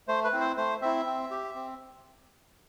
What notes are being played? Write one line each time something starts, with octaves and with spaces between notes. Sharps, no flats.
A3 C5
B4
C4 E4
C5
A3 C5
C4 E4 E5
C4
G4
C4